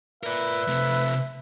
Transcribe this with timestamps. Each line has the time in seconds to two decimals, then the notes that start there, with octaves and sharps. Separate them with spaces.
0.23 A#4 B4 D5 E5
0.68 C3 A3